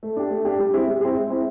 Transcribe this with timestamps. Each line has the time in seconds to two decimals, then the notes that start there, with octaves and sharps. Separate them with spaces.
0.03 A3
0.17 D4 G4
0.30 A3
0.45 D4 G4
0.59 G3
0.73 C4 E4 G#4
0.88 G3
1.01 C4 E4 G#4
1.16 G#3
1.30 C4 E4